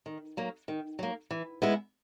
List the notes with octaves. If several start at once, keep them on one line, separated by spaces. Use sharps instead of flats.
D#3
F#3 A#3
D#3
F#3 A#3
E3
G#3 B3 E4